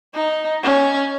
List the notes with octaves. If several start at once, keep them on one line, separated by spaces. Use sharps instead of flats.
D#4
C#4